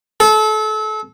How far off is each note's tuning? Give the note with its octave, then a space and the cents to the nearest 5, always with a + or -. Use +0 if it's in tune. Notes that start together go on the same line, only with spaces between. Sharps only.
A4 -30